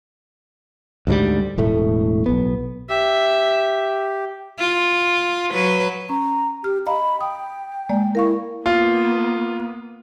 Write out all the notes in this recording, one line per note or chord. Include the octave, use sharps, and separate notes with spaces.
D2 G#2 F#3 G3
E1 A2 A3
B1 B3
G4 E5
F4
F#3 B4
C#4 A#5
G4 F6
D#5 F5 A#5 B5
G5 D#6
G#3 A#3 D5
E4 A#4 F5 C#6
A#3 B3 F4